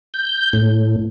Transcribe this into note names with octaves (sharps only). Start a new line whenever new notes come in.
G6
A2